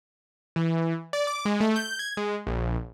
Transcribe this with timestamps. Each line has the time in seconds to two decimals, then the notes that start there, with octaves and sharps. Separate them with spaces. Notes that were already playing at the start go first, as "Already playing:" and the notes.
0.56 E3
1.13 D5
1.27 D6
1.45 G#3
1.60 A3
1.76 G6
1.99 G#6
2.17 G#3
2.47 A#1